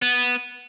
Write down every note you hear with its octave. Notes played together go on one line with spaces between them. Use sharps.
B3